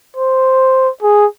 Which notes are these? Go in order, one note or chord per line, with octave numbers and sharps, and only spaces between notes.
C5
G#4